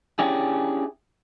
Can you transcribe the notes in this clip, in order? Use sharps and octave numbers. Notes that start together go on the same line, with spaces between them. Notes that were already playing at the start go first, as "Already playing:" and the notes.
C#4 D4 E4 G4 G#4